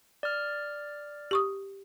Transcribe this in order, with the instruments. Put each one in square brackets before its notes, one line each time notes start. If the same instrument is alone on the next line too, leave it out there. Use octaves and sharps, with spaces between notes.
[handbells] D5 F6
[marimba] G4 C#6 D#6